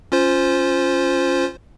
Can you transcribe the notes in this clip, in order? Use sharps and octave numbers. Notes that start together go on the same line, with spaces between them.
C#4 F4 C5